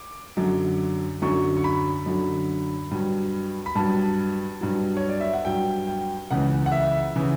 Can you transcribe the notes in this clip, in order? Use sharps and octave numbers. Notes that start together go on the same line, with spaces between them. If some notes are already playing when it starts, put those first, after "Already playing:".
Already playing: D6
F#2 D3 F#3
F#2 D3 F#3 C#6
C#6
B5
F#2 D3 F#3
G2 F#3
B5
G2 F#3 A5
G2 F#3
C#5
D5
E5
F#5
G2 F#3 G5
G5
C#2 C#3 E3 F#5
F#5
E5
C#3 E3